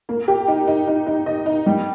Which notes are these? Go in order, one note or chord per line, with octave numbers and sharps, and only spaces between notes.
A#3
G4
D#4
D#4
D#4
D#4
D#5
D#4
G3